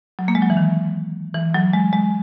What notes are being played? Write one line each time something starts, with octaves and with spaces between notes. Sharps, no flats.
F#3
A#3
G#3
F#3
E3
D#3
E3
F#3
G#3
G#3